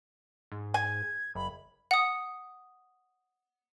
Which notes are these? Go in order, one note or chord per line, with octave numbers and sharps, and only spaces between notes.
G#2
G#5 G#6
F#1 B5
F#5 D#6